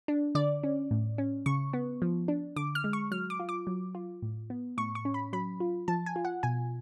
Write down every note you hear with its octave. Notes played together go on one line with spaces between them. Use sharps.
D4
D3 D5
C#4
A2
C#4
C#3 C#6
B3
F3
D4
D3 D6
F6
G#3
C#6
F#3 F6
D6
F4
D6
F#3
F4
A2
B3
A2 C#6
C#6
C#4
B5
F#3 B5
F4
F3 A5
G#5
F4
F#5
B2 G#5